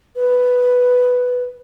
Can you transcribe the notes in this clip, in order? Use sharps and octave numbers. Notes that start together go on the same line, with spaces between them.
B4